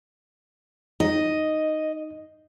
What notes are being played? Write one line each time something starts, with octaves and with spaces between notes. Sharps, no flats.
D#4 D#5